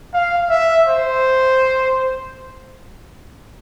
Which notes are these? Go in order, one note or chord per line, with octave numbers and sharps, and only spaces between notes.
F5
E5
C5